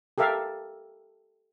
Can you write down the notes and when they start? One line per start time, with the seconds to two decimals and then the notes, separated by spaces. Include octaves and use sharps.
0.18 G4 A4 A#4 E5 F5